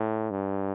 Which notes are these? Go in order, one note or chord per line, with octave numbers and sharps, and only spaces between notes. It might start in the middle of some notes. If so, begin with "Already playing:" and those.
Already playing: A2
G2